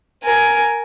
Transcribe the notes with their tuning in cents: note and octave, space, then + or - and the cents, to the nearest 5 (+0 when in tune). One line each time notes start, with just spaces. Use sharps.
A#4 +0 G#5 +10